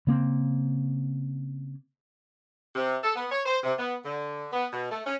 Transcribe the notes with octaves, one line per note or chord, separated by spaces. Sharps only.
C#3 A#3 C4
C3
A4
B3
C#5
C5
C3
B3
D3
B3
B2
A3
C#4